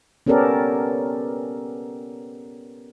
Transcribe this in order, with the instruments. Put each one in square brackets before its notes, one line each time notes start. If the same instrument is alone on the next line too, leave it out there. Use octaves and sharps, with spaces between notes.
[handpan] B3 C#4 G4 A4 A#4 D5